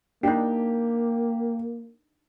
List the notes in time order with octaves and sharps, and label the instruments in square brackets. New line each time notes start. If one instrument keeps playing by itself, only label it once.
[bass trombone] A#3 [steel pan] D4 D#4 [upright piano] G4